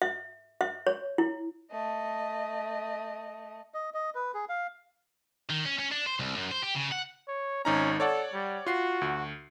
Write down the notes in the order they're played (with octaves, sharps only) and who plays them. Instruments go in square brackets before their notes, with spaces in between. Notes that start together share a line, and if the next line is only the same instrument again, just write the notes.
[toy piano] E5
E5
C#5
E4
[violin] A3 D#5
[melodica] D#5
D#5
B4
G#4
F5
[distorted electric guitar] D#3
C#4
C#4
D4
C5
C2
F#2
C5
G4
C#3
F#5
[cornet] C#5
[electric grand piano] G#1 D#4 A#5 [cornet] C#4
[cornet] A4 [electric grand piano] C#5 D5 F#5
[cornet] G3
[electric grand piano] F4 C7 [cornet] F#4
[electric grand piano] D2